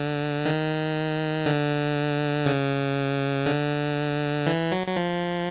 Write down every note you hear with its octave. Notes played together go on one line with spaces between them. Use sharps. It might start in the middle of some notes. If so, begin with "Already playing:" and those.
Already playing: D3
D#3
D3
C#3
D3
E3
F#3
F#3
F3